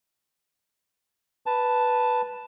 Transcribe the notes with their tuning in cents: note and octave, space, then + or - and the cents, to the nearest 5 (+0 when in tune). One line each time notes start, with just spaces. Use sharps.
B4 +0 A5 +0